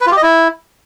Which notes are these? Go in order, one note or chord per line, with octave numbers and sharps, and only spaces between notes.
B4
F4
G4
D#5
E4